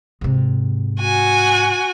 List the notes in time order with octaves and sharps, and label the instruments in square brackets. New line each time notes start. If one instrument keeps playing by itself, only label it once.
[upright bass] G#2 C3
[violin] F#4 G#5